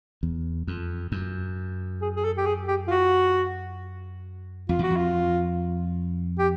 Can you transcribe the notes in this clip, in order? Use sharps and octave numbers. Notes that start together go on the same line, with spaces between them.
E2
F2
F#2
G#4
G#4
A4
G4
G#4
G4
F4
F#4
F2 F4
E2 F#4
F2
F4
G4